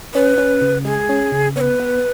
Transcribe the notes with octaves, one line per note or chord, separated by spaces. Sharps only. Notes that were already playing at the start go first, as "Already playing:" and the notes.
C#4 B4
C#4
C#3
G#3 G#4
C#4
C#3
B3 C#5
B4
B3